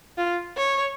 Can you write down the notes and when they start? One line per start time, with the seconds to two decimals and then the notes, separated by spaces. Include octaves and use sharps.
0.18 F4
0.57 C#5